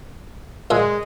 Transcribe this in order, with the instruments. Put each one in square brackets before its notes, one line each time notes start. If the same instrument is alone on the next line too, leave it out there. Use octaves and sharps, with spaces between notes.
[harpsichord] A#2 E5 [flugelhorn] G#3